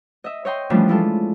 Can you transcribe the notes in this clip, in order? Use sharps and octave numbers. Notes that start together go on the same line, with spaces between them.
D#5 E5
C#5 D#5 G5 C6
E3 F3 G3 A3 C#4 D4
G#3 E4 F4 A4